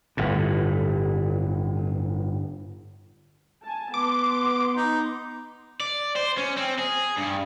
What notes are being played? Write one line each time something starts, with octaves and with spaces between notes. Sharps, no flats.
G1 A2
G#5 A5
B3 C6 D6
D#4
D5
C5
C#4
C4
G#4
G2